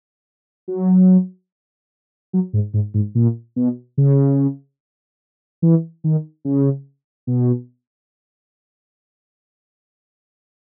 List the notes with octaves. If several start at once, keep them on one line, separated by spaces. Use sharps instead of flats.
F#3
F#3
G#2
G#2
G#2
A#2
B2
C#3
E3
D#3
C#3
B2